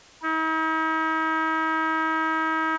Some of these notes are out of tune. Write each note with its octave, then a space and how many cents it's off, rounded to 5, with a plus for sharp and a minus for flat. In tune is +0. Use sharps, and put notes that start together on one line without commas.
D#4 +45